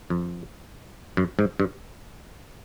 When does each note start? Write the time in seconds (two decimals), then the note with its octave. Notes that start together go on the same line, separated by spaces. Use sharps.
0.10 F2
1.17 F#2
1.39 G#2
1.60 G2